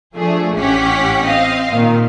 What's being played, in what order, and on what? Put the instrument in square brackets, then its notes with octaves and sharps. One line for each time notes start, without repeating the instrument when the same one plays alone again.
[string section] F3 A3 D4 G#4
A1 C#4 G4 F#5 B6
C4 D#5 F5
A#2 D#3